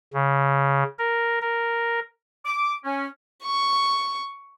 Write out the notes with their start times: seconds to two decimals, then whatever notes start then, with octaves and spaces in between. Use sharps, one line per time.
0.13 C#3
0.99 A#4
1.41 A#4
2.45 D6
2.85 C#4
3.43 C#6